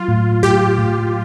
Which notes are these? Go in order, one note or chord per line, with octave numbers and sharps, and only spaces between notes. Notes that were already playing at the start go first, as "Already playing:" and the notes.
Already playing: F#3 F4
A2
A2 G4
A2